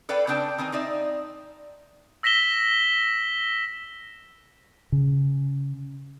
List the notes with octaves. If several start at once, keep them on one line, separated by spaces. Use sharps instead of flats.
A4 B4 D5 F5 G5
C#3 C4 D4 G5 A5
D#3 C4 D#4 G#5
C4 D#4 D5 E5
E6 A#6 B6 E7 G7
C#3